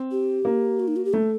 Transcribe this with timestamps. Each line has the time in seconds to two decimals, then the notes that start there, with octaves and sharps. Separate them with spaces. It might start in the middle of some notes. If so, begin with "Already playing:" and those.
Already playing: C4
0.11 G4
0.45 A#3
0.80 F#4
0.88 D#4
0.96 F#4
1.05 G4
1.13 A3 A4